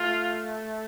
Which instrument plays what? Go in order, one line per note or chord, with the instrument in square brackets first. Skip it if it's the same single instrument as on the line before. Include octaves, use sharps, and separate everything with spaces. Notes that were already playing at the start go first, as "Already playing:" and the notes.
Already playing: [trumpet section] A3 F4